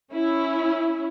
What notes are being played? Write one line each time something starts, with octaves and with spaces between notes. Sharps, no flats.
C#4 E4